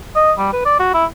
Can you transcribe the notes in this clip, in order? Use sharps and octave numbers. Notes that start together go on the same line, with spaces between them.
D#5
G3
B4
D5
F#4
E4